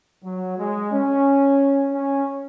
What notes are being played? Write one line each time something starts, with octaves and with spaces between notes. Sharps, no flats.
F#3
G#3
C#4
C#4